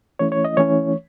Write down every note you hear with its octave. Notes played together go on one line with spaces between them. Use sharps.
E3 A3 C#4 E4 C#5
C#5
D#5
E3 A3 C#4 E4 C#5